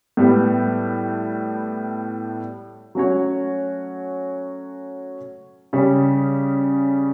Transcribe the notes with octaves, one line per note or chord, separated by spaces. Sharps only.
A2 G3 B3
F#3 A3 C#4 F#4 C#5
C#3 G3 C#4